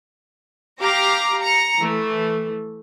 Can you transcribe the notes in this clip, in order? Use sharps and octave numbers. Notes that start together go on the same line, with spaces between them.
G4 F5 A#5 D6
A#5 C#7
E3 A3